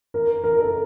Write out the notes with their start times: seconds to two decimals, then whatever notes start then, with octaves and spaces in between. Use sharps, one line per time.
0.14 A#4
0.44 A#4
0.59 A4